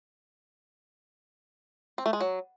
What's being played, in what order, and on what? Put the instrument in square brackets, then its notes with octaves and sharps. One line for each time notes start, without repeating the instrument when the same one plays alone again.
[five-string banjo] C4
A3
G#3
F#3